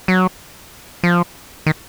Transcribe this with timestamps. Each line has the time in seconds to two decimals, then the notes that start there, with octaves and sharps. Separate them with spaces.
0.08 F#3
1.04 F3
1.66 D#3